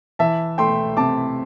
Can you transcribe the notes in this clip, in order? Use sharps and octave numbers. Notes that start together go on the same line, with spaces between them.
E3 E5 A5
A3 G5 C6
C3 A5 D6